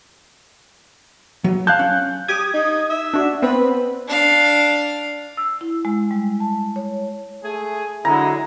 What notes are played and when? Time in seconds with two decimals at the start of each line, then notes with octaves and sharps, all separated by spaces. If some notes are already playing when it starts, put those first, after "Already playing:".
1.44 F#3
1.67 F5 A5 F#6 G6
1.79 C#4
2.28 G4 D#6 G#6
2.53 D#4
2.90 E5
3.14 D4 F#4
3.42 B3 C4 B4
4.08 D4 F5
5.37 E6
5.61 E4
5.85 G#3
6.11 G3
6.40 A5
6.76 C#5
7.44 A3 G#4
8.05 D3 F#3 G#3 E4 A#5